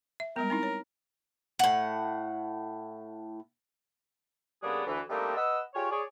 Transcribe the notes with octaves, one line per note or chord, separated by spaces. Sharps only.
E5
G3 G#3 B3 A#4
C4 D#4 E4
C#5
A2 F#5
C#3 G3 A#3 B3 D4 G#4
D2 E3
G3 A3 A#3 C4 D4 D#4
B4 D#5 F#5 E6
F4 G4 G#4 C#5
G#4 C#5 D5